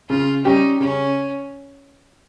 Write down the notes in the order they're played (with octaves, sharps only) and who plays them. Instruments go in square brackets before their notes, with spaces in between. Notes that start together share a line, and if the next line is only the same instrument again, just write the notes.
[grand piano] C#3 [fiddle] F4
[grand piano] G3 C#4 G4 [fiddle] D#4
[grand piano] C#3 [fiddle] C#4